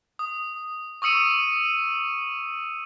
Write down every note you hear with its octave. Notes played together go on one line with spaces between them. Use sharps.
D#6
C#6 D#6 E6 C#7 D#7